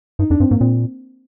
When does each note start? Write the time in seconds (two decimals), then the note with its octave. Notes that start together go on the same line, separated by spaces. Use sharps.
0.19 G2 D#4
0.30 F2 D4
0.40 G2 C4
0.50 G#2 A#3
0.61 A#2 C4